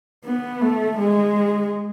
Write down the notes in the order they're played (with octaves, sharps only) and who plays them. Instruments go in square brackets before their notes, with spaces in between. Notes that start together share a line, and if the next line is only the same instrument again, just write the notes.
[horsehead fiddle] B3
A3
G#3